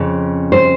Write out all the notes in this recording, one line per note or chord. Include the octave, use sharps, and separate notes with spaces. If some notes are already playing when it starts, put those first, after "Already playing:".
Already playing: F2 C#3
C5